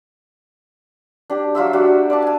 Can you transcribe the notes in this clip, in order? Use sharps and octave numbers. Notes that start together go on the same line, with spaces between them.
D4 G4
F#3 F4 E5 E6
D4 F#4 G4
D5 F5 A5
G#5 A5